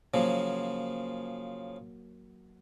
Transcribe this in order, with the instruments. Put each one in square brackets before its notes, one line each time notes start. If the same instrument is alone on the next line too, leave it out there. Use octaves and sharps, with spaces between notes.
[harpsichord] C#3 F3 [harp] F#3 A#3